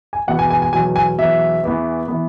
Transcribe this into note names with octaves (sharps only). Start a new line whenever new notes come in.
G#5
E2 B2 B3 F#5
G#5
G#5
G#5
E2 B2 F#3 G#5
G#5
E2 B2 F#3 E5
E2 E3 B3
E3 B3